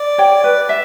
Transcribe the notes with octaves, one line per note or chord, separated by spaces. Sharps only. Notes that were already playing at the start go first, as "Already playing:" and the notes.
Already playing: D5
C#5 G5
B4
E5